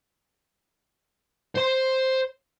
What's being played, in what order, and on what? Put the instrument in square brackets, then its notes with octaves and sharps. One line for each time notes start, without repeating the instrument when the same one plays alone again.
[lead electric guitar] C5 C6